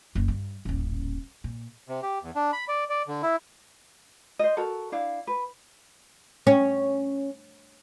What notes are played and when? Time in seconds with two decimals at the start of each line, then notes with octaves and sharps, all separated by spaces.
0.15 F#1 A#3
0.28 G2
0.65 D#1 A1
1.44 A#2
1.89 C3
2.03 G4
2.22 E2
2.36 D4
2.53 B5
2.68 D5
2.89 D5
3.07 D3
3.23 E4
4.39 C5 D#5
4.57 F#4 A4 A#4
4.92 D4 E4 F5
5.27 B4
6.47 C#4